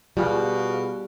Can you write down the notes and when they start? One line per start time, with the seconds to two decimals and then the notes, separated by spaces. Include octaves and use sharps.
0.17 B2 G3 F4 G#4 F5